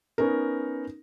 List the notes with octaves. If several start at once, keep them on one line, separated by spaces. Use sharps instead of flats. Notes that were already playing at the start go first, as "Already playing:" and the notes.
B3 C#4 D#4 A#4